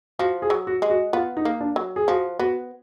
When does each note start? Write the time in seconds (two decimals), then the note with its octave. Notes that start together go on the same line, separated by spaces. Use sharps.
0.19 F3 F#4
0.42 G#4
0.50 F#3
0.67 F#4
0.82 G#3
0.90 F#4
1.13 B3 F4
1.37 D#4
1.45 A#3
1.60 D4
1.76 F#3
1.96 G#4
2.08 F3 F#4
2.39 B3 F#4